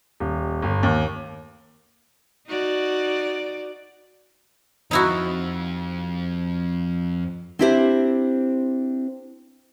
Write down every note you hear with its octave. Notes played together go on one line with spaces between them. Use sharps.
D#1
G1
D#2
D#4 F#4 D5
F2 D#4 E4 F#4
C4 D4 E4 G4 A4 C5